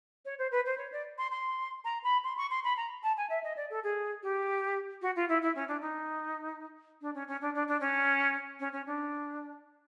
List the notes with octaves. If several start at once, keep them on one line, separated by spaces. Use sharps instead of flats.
C#5
C5
B4
C5
C#5
D5
C6
C6
A#5
B5
C6
C#6
C6
B5
A#5
A5
G#5
E5
D#5
D5
A4
G#4
G4
F#4
F4
E4
E4
C#4
D4
D#4
D4
C#4
C#4
D4
D4
D4
C#4
C#4
C#4
D4